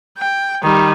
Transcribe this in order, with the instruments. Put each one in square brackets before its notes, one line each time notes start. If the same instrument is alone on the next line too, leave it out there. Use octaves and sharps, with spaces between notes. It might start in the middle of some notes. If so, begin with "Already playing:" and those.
[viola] G5
D#3 G3